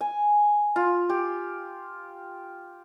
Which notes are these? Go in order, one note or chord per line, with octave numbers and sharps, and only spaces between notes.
G#5
F4
G4